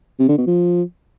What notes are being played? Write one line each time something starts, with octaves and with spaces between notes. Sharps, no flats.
C3
D3
B2
F3